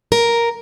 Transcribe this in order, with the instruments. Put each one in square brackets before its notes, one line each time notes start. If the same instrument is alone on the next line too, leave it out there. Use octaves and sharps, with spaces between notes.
[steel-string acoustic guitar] A#4